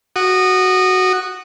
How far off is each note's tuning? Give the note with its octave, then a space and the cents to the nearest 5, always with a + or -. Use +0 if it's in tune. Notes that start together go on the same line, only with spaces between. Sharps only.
F#4 +5 D#6 -25